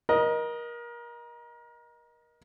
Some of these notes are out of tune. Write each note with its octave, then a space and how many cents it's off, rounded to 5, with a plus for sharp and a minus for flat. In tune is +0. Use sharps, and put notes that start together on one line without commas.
A#4 +30 D#5 +0